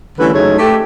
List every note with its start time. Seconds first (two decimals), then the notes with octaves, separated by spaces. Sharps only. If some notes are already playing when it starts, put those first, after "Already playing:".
0.19 D3 E3 G3 A3 C#4 B4
0.33 F#2 C#3 G#3 A3 D#4 C#5
0.58 A3 G4